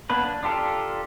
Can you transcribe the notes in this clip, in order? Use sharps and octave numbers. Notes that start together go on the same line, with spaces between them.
A#3 B3 D4 B4
D4
D4 F4 G4 A4 A#4